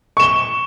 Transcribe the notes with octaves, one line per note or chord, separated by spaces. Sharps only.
C#6 E7 G7